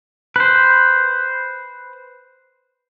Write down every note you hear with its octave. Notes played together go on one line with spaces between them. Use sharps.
B4 C5